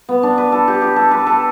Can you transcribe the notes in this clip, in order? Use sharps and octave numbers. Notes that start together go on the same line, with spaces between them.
B3
D4
B4
A4
G4
G4
A4
B4
A4